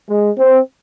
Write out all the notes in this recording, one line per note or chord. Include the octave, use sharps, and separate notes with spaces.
G#3
C4